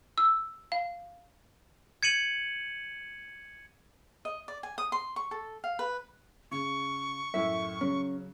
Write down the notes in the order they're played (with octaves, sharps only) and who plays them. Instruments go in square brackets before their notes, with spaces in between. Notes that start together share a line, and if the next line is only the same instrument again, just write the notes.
[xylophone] E6
F5
[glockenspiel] G#6 C#7 D#7 F#7
[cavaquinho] D#5
D5
G#5
D#6
C6
C#6
A4
F5
B4
[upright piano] C#3 [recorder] C#6
[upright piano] F#2 A2 E4 [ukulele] E5
[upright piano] C#3 F#3 [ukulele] C#4